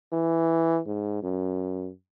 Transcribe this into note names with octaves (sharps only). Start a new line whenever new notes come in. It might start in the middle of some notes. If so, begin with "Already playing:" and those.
E3
G#2
F#2